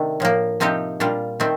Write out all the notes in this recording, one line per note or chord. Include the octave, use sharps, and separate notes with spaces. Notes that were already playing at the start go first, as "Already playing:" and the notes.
Already playing: C3 D#3 A3 D4
A2 F3 A#3
C3 F3 C4 D#4 G4
A#2 G3 D4 F4
D#3 A3 C4